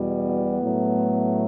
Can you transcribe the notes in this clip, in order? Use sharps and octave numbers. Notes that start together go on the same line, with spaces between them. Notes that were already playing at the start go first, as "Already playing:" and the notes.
Already playing: E2 B2 G3
B3
A2 F#3 A3